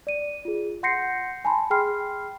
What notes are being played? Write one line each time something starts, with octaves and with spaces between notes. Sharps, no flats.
D5 D#7
F4 G#4
F#5 C6 G6 A#6 C7 C#7
G#5 A5 B5 C6
G#4 G5 B5 C6 F6 C7